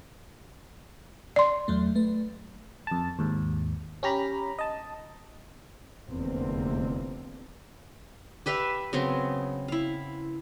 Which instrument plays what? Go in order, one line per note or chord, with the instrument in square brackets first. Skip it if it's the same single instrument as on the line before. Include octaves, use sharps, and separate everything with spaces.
[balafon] D5 C6
[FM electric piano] E2 F#3 A3
A3 B4
F2 A5
D#2 G#2
C#4 G4 A#5 B5
D#5 A5
[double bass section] F1 E2 D3 A#3 C4
[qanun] G4 B4 E5 F5
C#3 F#3 B3 C4
E4 F5